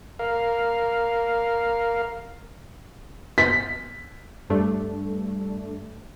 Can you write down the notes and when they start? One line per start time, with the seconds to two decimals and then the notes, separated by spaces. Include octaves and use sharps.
0.19 A#4 F5
3.38 B6
4.50 G2 A3 D4